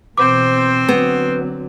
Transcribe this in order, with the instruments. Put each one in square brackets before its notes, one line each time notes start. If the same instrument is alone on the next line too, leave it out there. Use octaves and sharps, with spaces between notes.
[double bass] B2 E3 [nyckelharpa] C4 C5 [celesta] D6
[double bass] D3 F#3 [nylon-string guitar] B3